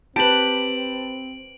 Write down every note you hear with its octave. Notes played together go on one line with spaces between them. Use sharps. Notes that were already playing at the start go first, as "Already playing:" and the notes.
C4 G4 B4 A5 D7 F#7